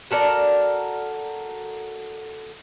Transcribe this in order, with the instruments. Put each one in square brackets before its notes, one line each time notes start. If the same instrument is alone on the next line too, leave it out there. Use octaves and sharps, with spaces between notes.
[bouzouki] F#4 A4 A#4 D5